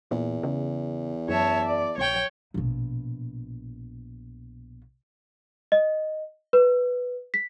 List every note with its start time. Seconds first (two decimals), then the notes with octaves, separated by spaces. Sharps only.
0.11 E2 A#2
0.43 C#3
1.29 F#2 C#5 E5 A5
1.64 D5
1.98 A#1 C#5 G5
2.54 A#1 B2
5.72 D#5
6.53 B4
7.34 B6